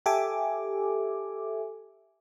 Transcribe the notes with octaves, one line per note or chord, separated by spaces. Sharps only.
G4 A4 E5 G#5 D6